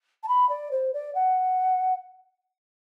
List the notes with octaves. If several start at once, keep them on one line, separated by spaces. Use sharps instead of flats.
A5
B5
D5
C5
D5
F#5